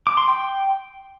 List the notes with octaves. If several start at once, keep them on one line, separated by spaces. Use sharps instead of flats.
D6
C6
G5